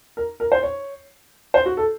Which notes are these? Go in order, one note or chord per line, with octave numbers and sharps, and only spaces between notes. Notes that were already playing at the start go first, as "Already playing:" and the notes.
A#4
A#4
C5
C#5
C5
F#4
A4